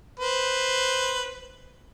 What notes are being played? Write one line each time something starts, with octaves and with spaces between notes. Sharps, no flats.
B4 C5